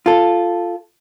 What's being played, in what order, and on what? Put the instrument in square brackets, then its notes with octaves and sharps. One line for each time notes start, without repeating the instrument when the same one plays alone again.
[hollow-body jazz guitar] F4 A4